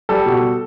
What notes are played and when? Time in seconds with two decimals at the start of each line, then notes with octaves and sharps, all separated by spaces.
0.09 G3 A4
0.26 B2